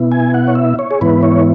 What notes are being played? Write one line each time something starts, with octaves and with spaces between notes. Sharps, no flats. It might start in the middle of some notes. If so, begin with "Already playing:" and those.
Already playing: B2 B3 E4
G#5
F#5
C#5
E5
C#5
G#4
G#2 E3 B3 E4 B4
C#5